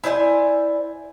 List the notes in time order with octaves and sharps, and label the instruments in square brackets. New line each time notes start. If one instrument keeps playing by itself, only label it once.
[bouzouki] E4 C5 D5 G#5